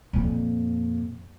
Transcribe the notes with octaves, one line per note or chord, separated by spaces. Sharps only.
F2 A#2